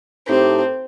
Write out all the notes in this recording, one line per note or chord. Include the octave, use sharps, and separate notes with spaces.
A2 A3 C4 D#4 G4